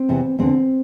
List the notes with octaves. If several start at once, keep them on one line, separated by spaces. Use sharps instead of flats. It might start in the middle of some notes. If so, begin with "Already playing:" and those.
Already playing: C4
E2 C3 E3
E2 D3 C4